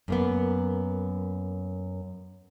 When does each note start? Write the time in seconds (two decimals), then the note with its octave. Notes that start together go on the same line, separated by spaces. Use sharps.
0.08 F#2 A#3 B3